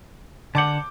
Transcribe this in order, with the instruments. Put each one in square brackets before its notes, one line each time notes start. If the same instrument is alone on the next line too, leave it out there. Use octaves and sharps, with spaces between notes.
[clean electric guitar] D3 F#5 [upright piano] A5 D6 G6